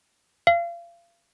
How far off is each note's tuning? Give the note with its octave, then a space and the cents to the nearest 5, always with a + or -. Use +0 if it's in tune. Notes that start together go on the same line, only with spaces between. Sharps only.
F5 -30